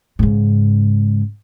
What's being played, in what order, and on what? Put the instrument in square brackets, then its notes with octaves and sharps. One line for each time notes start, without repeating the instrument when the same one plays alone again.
[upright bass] G#2 C#3